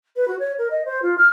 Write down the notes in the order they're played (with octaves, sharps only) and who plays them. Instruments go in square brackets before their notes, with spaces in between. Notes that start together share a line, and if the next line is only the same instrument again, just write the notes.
[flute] B4
F#4
C#5
A#4
D#5
C5
F4
F6